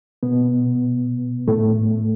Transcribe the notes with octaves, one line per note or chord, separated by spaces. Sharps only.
B2 B3
A2 A3